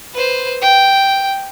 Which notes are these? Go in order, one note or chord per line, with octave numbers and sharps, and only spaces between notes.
B4 C5
G5